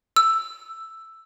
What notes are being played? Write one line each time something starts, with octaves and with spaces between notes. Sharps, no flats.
E6